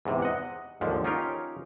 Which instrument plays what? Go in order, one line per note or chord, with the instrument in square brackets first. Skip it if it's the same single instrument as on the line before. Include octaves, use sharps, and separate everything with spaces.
[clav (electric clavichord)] E2 G#2 C3
D#5 F#5
D#2 G#2 D3 F3
C#4 D#4 F4 G4 A#4 C#5